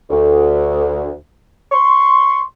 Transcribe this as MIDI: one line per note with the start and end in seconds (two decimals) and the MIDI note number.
0.10 1.10 38
1.72 2.41 84
1.72 2.41 85